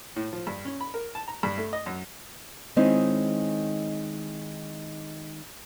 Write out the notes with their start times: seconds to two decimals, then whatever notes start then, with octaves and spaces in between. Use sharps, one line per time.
0.16 A2
0.33 F3
0.47 G2
0.65 C#4
0.81 B5
0.94 A#4
1.15 A5
1.28 A#5
1.43 G2
1.57 A3
1.73 D#5
1.86 F#2
2.76 D#3 G#3 C4 C#4 D#4 E4